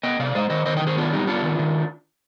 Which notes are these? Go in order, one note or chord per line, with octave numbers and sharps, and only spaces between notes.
B3 D#5 G5
C3 D5 F5
G#3 C5 D#5
D#3 C5 D#5
D#3 C5 D#5
D#5 G5
D#3
G#4 C5
B3 D4 F4
G3 D#4 G4
B3 D4 F4
D#3
D#3